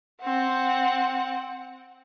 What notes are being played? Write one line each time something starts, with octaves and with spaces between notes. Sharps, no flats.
C4 F#5